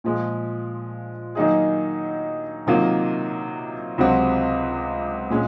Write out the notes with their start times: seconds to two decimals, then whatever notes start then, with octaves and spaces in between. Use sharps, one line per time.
0.04 A#2 F3 G#3
1.35 D#3 F#3 A#3 D#4 G#4
2.67 C3 D#3 F#3 A#3 F4
3.98 C#2 C3 F#3 C4 F#4
5.30 A#2 G#3 C#4